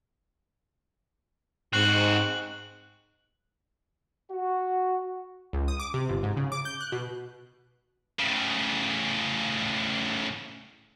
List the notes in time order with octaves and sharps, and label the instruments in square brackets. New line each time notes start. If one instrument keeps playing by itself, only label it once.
[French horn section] G#2 [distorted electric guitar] C4 F#4 [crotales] F#6 F#7
[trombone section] F#4
[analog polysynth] C#2
D#6
D6
C3
G1
G#2
C#3
D6
G6
F#6
B2
[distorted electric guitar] A2 C#3